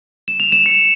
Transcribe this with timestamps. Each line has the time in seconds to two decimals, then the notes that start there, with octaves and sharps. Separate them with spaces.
0.28 E7
0.40 F7
0.52 E7
0.66 C#7